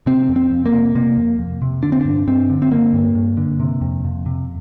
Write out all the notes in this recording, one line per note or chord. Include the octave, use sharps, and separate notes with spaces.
C3 C4
F2
C4
F2
A#3
C3
C3 A#3
F2
F2
C3
D3 D4
C4
G2 D4
G2 C4
D3
C4
D3 A#3
G2
G2
D3
C3
F2
F2
C3